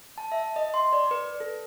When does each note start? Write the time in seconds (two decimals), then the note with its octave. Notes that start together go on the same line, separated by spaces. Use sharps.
0.18 A5
0.32 E5
0.56 D#5
0.74 C6
0.93 D5
1.11 B4
1.40 A4